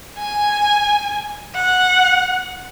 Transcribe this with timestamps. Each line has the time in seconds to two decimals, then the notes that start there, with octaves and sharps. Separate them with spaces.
0.19 G#5
1.55 F#5